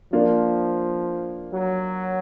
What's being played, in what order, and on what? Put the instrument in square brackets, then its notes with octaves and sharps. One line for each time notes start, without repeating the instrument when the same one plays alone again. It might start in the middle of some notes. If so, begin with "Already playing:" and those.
[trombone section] F3 [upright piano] A#3 D4 F4
[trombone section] F#3